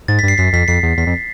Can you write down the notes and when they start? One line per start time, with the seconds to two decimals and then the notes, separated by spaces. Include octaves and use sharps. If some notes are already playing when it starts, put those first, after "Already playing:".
0.08 G#2 A6
0.19 B6
0.23 G2
0.28 C7
0.38 F#2 B6
0.53 F2 B6
0.68 F2 C7
0.83 E2
0.97 E2 B6
1.07 F2